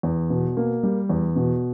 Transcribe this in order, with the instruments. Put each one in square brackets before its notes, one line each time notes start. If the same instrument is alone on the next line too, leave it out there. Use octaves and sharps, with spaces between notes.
[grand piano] E2
B2
A#3
G3
E2
B2